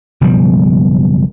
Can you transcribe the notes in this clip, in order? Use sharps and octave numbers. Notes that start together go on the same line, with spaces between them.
F#1 B2 F3 G3